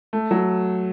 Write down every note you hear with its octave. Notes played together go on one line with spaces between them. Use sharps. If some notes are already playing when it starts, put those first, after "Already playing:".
A3
F#3